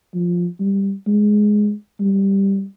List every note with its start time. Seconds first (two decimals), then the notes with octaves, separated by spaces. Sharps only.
0.14 F3
0.60 G3
1.07 G#3
2.00 G3